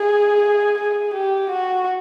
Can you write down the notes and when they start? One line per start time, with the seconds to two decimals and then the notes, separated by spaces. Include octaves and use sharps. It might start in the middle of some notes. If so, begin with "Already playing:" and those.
Already playing: G#4
0.79 G#4
1.14 G4
1.51 F#4